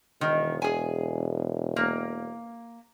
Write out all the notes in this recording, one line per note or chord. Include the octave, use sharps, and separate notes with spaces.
E1 D#3
G#4 G#5
A#3